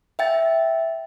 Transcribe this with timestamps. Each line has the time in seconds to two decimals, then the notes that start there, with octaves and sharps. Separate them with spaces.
0.19 E5 G5 A6